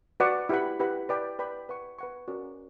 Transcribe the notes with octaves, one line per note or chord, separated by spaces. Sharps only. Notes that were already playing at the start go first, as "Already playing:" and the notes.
F#4 B4 D5 F#5 C#6
E4 G4 B4 F#5 B5
E4 G4 B4 F#5 B5
B4 D5 G5 B5
B4 D5 G5 B5
B4 F#5 C#6
B4 F#5 C#6
C#4 F#4 A#4 D5